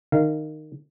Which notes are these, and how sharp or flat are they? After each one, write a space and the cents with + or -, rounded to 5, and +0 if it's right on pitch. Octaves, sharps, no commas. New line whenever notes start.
D#3 -15 F5 -20